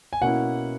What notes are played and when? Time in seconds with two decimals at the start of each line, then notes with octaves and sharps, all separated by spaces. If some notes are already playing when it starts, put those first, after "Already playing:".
0.13 G#5
0.21 B2 A#3 C#4 E4 F#5